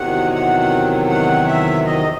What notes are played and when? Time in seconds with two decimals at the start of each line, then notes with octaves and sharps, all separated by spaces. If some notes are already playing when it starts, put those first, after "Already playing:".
Already playing: E2 C3 D#3 F#3 F#5
0.34 F#5
0.60 F#5
1.09 F#5
1.47 E5
1.86 D#5